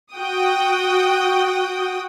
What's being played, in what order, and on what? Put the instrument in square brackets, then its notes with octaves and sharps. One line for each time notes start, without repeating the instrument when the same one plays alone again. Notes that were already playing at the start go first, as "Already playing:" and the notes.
[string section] F#4 G5 D#6